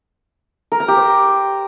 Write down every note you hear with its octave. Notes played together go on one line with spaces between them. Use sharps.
A#4
A#5
G4
C5